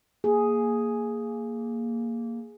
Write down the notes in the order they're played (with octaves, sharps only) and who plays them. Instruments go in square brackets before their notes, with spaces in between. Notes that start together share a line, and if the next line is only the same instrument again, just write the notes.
[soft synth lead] A#3 [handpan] G#4